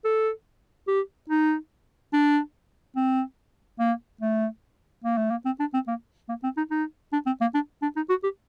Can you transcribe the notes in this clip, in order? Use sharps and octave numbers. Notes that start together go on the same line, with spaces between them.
A4
G4
D#4
D4
C4
A#3
A3
A#3
A3
A#3
C4
D4
C4
A#3
A#3
C4
D#4
D#4
D4
C4
A#3
D4
D4
D#4
F#4
G4